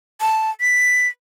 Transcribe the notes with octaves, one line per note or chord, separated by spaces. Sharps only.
A5
B6